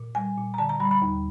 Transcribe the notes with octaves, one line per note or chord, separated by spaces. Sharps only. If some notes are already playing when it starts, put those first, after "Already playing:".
Already playing: A#2
G3 G#5
A#2
A#5
D3 A5
A#5
G3 B5
B5
D#2